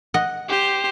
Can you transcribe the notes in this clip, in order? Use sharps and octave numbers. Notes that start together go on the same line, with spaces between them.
D#5 F#5
G4 C5